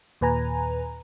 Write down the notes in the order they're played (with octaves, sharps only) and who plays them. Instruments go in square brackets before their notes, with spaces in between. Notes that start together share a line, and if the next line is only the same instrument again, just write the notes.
[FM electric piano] D#2 A#2 B4 G#5 A#5